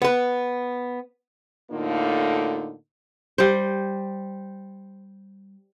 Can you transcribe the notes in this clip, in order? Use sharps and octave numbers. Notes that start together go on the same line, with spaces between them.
B3 B4
A2 D3 A#3 D#4 F4
G3 C5